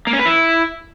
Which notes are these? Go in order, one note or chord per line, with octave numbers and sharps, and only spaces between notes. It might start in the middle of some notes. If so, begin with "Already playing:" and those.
A#3
C#4
B4
E4